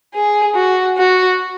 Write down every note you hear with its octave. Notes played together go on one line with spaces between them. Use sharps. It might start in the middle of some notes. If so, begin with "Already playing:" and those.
G#4
F#4
F#4